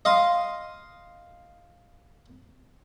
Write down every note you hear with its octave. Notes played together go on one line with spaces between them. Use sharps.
D#5 F5 C6